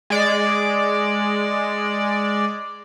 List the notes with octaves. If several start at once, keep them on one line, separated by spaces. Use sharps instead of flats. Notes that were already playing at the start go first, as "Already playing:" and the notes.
G#3 D5